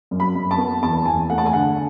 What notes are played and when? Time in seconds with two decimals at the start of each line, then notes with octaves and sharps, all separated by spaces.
0.11 F#2
0.20 B5
0.35 F#2
0.51 A5
0.58 B3
0.83 E2 A5
1.06 E2 G#5
1.30 A3 F#5
1.38 A5
1.46 G#5
1.53 D3 F#5